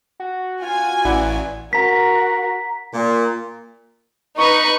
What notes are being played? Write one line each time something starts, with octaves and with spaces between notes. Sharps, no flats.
F#4
F4 F#4 G#5
A1 E4 D5 F#5
F#4 A#4 A#5 B6
A#2
D#4 B4 C#6